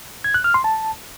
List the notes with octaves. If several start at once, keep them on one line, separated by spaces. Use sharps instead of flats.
G#6
F#6
F6
C6
A5